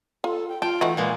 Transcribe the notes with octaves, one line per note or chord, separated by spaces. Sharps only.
F4 A4
G5
F4 G5 A5
D#3 E3 A3 F#4
A#2 G#3 A#3 B4